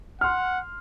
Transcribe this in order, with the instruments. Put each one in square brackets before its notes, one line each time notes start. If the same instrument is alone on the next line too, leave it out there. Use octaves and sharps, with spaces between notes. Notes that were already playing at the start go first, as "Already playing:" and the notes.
[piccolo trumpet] F#5 [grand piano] C6 F6